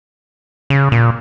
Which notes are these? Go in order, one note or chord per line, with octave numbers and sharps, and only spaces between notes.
C#3
A#2